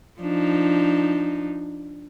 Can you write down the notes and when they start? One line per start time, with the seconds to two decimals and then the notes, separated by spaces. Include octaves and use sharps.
0.20 F3 D4 D#4